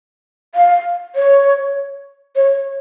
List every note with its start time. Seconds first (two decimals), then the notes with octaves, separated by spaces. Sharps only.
0.55 F5
1.16 C#5
2.36 C#5